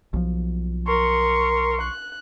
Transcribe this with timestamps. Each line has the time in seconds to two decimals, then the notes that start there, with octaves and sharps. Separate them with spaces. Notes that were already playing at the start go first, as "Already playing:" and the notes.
0.13 B1 F3
0.87 A#4 C6 C#6
1.81 F#6